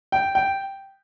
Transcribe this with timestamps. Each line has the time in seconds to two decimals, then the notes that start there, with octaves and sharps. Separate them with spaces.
0.12 G5
0.35 G5